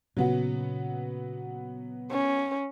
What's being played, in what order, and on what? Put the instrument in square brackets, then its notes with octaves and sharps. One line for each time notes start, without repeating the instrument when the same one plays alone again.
[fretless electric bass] A#2 C#3 [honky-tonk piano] F#3 B3 F#4
[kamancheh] C#4